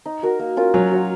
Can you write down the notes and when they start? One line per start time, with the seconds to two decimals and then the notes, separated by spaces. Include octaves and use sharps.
0.05 D#4
0.23 F#4 A#4
0.39 A#3
0.57 C#4 F4 A#4
0.74 F#3 C#4
0.91 F#4 C#5 F5